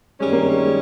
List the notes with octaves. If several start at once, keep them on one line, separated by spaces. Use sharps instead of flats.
G2 D#3 G3 G#3 C#4
A#3
G#3